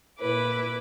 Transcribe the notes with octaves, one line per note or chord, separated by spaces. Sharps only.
A#2 E4 B4 D6